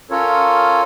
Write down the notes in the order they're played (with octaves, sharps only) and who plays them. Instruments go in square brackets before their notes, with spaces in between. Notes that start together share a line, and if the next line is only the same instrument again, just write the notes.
[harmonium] C#4 F4 A4 A#4 C#5